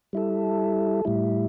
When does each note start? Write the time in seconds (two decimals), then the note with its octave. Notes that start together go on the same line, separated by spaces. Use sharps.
0.13 G3 E4 A4
1.05 A2 G3 E4